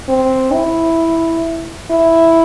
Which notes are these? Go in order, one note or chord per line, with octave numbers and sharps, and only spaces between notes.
C4
E4
E4